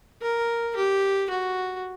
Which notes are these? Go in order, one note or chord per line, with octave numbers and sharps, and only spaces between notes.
A#4
G4
F#4